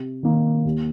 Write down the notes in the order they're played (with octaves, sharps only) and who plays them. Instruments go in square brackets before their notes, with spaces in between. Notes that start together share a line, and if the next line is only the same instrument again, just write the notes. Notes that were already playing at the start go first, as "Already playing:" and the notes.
Already playing: [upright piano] C3
D#3 A#3
D#2